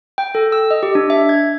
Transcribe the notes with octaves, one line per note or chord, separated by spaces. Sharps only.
G5
A4
E6
D#5
G4
D4
E5
G#6